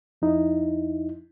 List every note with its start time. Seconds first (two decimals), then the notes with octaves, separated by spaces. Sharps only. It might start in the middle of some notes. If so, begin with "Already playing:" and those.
0.22 F2 D#4 E4